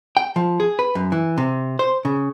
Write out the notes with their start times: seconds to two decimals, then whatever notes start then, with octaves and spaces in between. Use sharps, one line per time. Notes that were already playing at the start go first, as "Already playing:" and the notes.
0.17 G5
0.36 F3
0.60 G#4
0.79 B4
0.95 F#2
1.12 E3
1.38 C3
1.79 C5
2.05 C#3